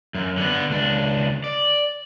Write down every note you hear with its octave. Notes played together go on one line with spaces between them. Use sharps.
F#2
D3 B3
C#2 D4
D5